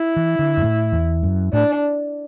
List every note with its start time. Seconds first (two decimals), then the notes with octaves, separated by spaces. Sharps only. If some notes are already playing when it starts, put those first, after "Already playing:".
Already playing: E4
0.16 E3
0.39 D3
0.57 F#2
0.62 A2
0.92 E2
1.23 F#2
1.53 A2 D4